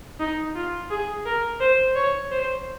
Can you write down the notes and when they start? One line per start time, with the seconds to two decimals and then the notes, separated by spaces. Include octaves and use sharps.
0.19 D#4
0.55 F4
0.90 G#4
1.26 A#4
1.61 C5
1.96 C#5
2.31 C5